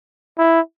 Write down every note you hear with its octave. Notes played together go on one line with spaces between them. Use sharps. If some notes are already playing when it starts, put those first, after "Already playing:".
E4